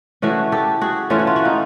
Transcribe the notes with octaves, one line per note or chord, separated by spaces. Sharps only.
E3 A3 C#4 F#4 G#4
G4 A4
F#4 G#4
E3 A3 C#4 F4
F#4
F4
F#4
D#4 F4